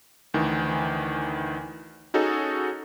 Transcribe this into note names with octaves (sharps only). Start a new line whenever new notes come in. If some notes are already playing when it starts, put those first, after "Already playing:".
D2 D#3 E3
C#4 D#4 F#4 G#4 A4 C#5